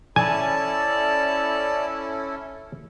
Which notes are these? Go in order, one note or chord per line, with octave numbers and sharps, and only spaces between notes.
C#4 E4 A4 D5 G#5 A5